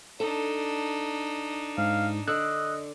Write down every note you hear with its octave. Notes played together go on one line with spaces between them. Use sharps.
D4 D#4 A4
G#2 F5
D3 D5 D#5 E6 F#6